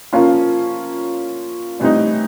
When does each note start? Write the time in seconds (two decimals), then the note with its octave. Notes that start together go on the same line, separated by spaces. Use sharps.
0.13 F3 A#3 C#4 F4
1.79 A2 E3 G3 C4 D#4